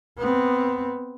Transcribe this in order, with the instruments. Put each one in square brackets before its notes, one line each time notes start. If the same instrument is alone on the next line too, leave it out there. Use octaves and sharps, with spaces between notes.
[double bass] B3 C4